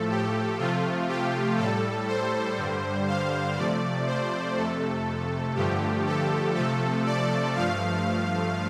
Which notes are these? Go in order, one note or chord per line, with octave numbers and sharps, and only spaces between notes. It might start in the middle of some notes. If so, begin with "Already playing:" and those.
Already playing: A2 F3 A3 A4
G4
C3 F3 A3 F4
G4
A2 G3 A4
C5
G2 D3 G3
F5
C3 F3 A3 D5
C5
F2 C3 A3 A4
G2 D3 F3 A3 G4
A4
C3 F3 A3 A4
D5
G2 F3 A3 F5